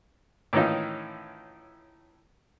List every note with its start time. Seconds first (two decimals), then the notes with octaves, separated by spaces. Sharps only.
0.53 A2 D#3 E3 C#4 D#4 F4